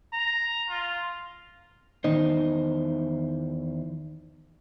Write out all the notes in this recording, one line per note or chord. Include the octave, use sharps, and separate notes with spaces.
A#5
F4
E2 D#3 D#4 C5